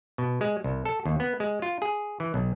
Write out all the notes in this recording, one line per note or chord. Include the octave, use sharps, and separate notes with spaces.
B2
G#3
C2
A4
D#2
B3
G#3
F4
G#4
E3
B1